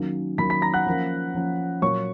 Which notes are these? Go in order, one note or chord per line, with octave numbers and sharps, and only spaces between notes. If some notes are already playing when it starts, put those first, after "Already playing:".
Already playing: D#3 F#3 A#3 C#4
D#3 F#3 A#3 C#4 B5 B6
B5 B6
A#5 A#6
F#5 F#6
F3 A#3 C#4
F3 A#3 C#4
A#2 F#3 A#3 C#5 C#6